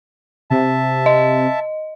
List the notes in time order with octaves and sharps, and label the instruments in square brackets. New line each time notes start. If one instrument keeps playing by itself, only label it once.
[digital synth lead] C3 [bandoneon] E5 A5
[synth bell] D#5